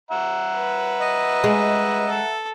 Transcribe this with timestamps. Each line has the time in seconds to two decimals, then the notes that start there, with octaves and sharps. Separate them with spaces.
0.11 E5 F#5 A#5
0.55 B4
1.00 D#5
1.44 G#3
2.09 A4